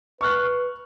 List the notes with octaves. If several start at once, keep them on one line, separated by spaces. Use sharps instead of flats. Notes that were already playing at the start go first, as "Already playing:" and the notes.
B4 C#6 F6 F#6